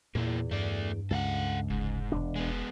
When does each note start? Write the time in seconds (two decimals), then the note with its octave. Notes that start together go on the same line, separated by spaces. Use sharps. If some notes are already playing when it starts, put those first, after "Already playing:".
0.15 E2 A#2 A#3 E4
0.51 G2 A3 D5
1.11 C#2 A4 F5 F#5
1.70 F1 G#2
2.12 E1 D4
2.36 G#3 B3